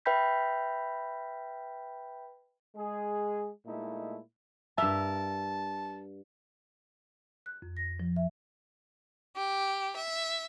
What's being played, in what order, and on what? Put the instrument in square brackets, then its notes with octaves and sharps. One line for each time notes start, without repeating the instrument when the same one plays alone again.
[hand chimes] B4 E5 G5 B5 G6 B6
[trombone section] G#3 G#4
A#2 G#3 A3 D#4 E4
[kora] G2 A#4 [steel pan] E5 [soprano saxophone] A5
[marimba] F#6
F2
A#6
F3
E5
[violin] G4
E5